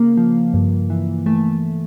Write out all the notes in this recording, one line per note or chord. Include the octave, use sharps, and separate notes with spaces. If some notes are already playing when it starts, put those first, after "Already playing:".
Already playing: C#3 A#3
F3
G2
E3
E3 A3